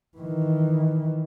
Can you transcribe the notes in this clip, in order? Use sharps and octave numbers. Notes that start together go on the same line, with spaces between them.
D#3 E3